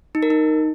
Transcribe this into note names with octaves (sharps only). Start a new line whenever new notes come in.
D#4
A#4
D#4